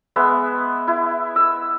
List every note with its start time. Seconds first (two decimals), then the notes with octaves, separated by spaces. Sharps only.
0.16 G#3 B3 E5
0.87 E4
1.36 E6